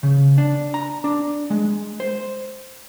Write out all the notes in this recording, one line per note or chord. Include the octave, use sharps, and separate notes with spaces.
C#3
D4
A#5
D4
G#3
C5